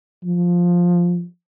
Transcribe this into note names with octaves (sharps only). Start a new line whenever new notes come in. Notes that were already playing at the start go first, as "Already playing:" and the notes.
F3